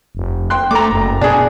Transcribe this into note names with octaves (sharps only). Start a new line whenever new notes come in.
F1
G5 C6 F#6
A3 A#5 D6
F#1
B2 D4 G#4